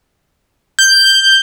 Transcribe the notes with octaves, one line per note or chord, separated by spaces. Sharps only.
G6